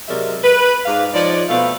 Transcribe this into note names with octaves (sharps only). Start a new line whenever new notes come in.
C3 F#3 G#3 A#4 D5 E5
B4
G#2 B4 D5 F5
F3 D#4 C#5 D5
B2 A3 C4 B4 F5